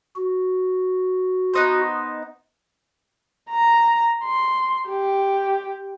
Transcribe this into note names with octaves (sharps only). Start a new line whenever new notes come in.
F#4
B3 D#4 C5
A#5
C6
G4